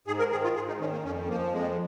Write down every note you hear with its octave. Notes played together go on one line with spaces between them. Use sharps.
G#2 G#4
A#4
D#3 G#4
F4
G#2 G#4
D#4
D#3 C#4
A#3
F2 C#4
F3 A#3
F2 G#3